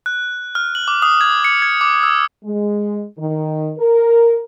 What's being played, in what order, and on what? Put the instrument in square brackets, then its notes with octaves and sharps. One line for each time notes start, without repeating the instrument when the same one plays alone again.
[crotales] F#6
F6
F#7
D6
D#6
G#6
C#7
G#6
D6
E6
[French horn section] G#3
D#3
A#4